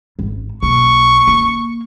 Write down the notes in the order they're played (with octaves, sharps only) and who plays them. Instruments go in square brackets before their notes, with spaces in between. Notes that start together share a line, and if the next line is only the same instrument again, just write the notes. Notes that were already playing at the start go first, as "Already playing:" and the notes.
[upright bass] G#1
[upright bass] B1 A#3 [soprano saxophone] C#6
[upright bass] A#3